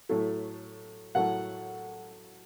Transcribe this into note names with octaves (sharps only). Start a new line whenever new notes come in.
A2 F#3 A3
A2 F#3 A3 F#5